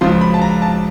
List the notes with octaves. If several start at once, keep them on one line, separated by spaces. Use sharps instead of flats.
C#2 C#3 F3 C6
B5
A5
A#5
A5